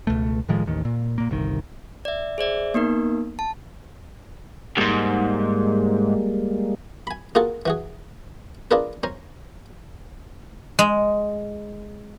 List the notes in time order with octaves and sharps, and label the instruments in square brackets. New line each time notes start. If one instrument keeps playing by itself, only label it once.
[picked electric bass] C#2 B2 A3
A2 D#3 F3 G#3
A1 D#2 D#3
A#2
A#2 A#3
G1 C2 D#3
[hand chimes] D5 E5
G#4 C5 D5 E5
A#3 B3 D#4 A#4
A5
[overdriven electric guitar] D2 G#2 [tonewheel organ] G3 G#3 A#3
[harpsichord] G#5 B5
A#3 F4 F#4 G#4 A4
E3 F#4 G#4
D4 F4 G#4 A#4 B4
C#4 C5 A#5
[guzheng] G#3